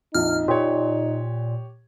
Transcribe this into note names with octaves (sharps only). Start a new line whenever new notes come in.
A#1 F2 D#4 F6
A#2 G4 C#5